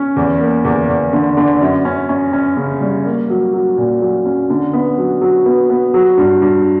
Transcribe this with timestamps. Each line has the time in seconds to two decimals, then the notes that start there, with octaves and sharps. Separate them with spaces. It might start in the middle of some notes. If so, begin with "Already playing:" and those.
Already playing: C#4
0.16 E2
0.41 A#3
0.65 E2
0.89 E2
1.13 D3
1.37 D3
1.61 F#2
1.85 C#4
2.09 C#4
2.33 C#4
2.57 C#3
2.81 G3
3.05 A#3
3.30 F#3
3.53 F#3
3.77 A#2
4.01 F#3
4.26 C#4
4.50 D3
4.73 B3
4.98 F#3
5.21 F#3
5.46 B3
5.70 B3
5.94 F#3
6.18 G2
6.42 G2